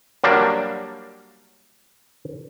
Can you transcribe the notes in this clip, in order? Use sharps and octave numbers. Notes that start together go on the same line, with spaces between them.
F#3 G3 A#3 D4